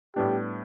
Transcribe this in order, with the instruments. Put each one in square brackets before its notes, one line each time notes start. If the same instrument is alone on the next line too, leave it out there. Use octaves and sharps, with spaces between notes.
[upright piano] A2 G3 B3 D4 [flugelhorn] G4